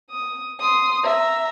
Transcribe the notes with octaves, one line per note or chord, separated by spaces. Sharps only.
D#6
C6 D#6
E5 A#5